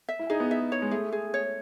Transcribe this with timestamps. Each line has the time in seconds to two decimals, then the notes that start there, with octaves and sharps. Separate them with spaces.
0.09 E5
0.19 E4
0.30 D#4 G#4
0.40 B3
0.51 E5
0.72 C#5
0.82 G#3
0.91 A3 G#4
1.12 G#4
1.34 C#5